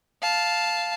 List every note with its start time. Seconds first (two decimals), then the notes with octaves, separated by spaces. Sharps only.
0.22 F5 A5